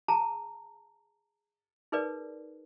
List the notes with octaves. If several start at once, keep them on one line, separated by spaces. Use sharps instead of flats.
G#4 A5 A#5
D#4 G#4 A#4 B4 D5